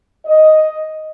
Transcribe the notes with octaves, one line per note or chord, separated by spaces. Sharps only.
D#5